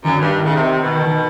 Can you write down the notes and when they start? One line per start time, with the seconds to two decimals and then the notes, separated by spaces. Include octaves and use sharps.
0.04 F#2 D#3
0.13 D3
0.21 G2 D#3
0.39 A2
0.46 C#3
0.55 C3
0.81 B2
1.06 D#3